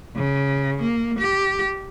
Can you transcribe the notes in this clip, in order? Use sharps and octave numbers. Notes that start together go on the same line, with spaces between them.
C#3
A#3
G4